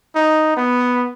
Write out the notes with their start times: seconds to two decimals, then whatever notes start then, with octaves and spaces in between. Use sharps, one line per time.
0.15 D#4
0.57 B3